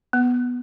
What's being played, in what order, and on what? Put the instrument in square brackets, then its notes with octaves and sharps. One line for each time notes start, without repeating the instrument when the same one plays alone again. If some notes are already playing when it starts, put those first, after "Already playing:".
[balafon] B3